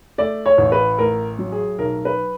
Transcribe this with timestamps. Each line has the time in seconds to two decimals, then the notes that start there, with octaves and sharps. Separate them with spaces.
0.18 A3 D5
0.46 C#5
0.58 A1
0.72 B4
0.98 A2 A#4
1.38 F#3
1.52 G#4
1.78 B1 A#4
2.05 B4